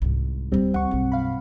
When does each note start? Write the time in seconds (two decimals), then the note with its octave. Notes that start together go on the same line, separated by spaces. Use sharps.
0.02 C2 G#2
0.52 D#1 D#2 G3 C4
0.74 C#2 F#5 C#6
0.91 B1 F#2
1.12 F5 B5